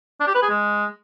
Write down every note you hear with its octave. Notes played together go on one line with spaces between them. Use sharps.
D4
G4
B4
G#4
G#3